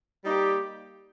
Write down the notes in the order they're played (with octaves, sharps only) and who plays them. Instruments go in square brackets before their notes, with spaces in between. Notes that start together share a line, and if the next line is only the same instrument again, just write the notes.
[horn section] G3 A#3 D#4 G4